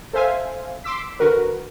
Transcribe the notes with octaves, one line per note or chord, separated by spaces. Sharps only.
A4 C5 E5 F5 G#5
C6 D6 E6 B6
D3 F#4 A#4 B4